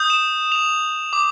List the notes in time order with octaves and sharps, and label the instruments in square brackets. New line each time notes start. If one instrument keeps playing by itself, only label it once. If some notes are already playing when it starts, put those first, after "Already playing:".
Already playing: [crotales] D#6 G6
E7
F7
D6